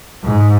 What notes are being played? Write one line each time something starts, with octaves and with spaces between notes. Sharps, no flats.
G#2